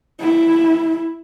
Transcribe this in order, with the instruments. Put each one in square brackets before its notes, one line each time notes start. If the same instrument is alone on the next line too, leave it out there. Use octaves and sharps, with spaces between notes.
[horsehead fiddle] E4